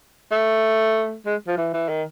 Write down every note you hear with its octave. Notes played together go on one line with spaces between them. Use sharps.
A3
G#3
F3
E3
E3
D#3